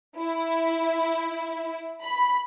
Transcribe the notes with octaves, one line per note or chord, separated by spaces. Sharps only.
E4
B5